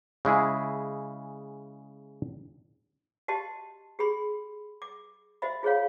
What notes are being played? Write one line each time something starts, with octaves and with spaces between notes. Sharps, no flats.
C#3 G#3 E4 G#4
F#4 G4 D#5 A5 C6
G4 G#4 B5 C6
D6
F#4 C5 D#5 E5 B5
F4 G#4 C5 C#5 F5